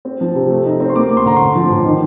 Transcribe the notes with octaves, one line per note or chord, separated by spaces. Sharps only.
C4
F3
C3
A3
D#4
C4
C6
A#3 D6
A#3
C6
D3 A#5
A2 C6
F3
A1
D#3